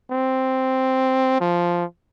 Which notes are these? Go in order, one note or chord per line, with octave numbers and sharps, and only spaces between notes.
C4
F3